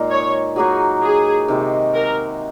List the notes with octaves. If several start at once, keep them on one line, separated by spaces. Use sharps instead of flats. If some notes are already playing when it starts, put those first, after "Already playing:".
Already playing: A#2 G#3 D#4
C#5
F#3 A#3 D#4 F#4 G#4
G#4
C3 D#3 G#3
A#4